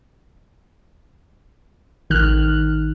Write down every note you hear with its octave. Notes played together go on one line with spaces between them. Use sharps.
A1 D#3 F6 F#6